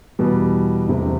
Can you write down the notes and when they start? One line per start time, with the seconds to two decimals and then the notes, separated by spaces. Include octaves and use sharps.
0.19 E2 B2 G3
0.88 E1 D2 C3